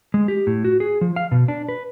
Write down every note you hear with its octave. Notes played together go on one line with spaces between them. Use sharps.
G#3
G4
A2
F#4
G#4
F3
F5
B2
D4
B4